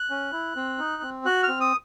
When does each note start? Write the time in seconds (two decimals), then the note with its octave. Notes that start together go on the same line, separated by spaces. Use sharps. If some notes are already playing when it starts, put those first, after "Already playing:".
Already playing: F#6
0.10 C#4
0.32 E4
0.56 C4
0.79 D#4
1.02 C4
1.25 F#4 F#6
1.43 F6
1.48 C4
1.60 D#6